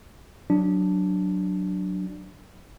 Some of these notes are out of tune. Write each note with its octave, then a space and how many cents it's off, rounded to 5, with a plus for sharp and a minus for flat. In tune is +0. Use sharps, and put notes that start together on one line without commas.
F#3 +0 D4 +0